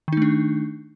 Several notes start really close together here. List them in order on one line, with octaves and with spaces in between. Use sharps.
D#3 D#4 A3 D4